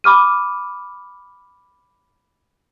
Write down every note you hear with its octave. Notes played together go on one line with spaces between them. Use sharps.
B5 D6 F6 D#7